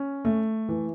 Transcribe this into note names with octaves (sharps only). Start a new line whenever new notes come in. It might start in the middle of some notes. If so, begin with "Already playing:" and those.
Already playing: C#4
A3
E3